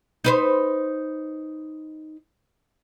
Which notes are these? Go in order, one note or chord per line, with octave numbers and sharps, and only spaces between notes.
D#4 B4 C5